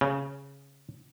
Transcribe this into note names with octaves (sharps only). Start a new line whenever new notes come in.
C#3